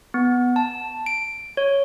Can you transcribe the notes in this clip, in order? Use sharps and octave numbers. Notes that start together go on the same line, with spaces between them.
B3
A5
D7
C#5